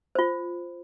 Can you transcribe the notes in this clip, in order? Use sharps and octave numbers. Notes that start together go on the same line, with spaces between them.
F4 C5